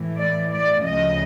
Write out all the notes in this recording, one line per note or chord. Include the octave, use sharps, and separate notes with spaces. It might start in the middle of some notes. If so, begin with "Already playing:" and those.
Already playing: A2 E3
D5
D5
D2 C#3 F3 D#5